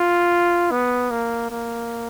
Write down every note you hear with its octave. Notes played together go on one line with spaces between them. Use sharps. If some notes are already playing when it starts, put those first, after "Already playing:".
Already playing: F4
B3
A#3
A#3